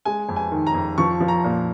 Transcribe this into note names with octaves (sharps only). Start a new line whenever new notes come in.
G#3 G#5
F2
G#5
D#3
A#5
F2
F3 C#6
F3
A#5
A#2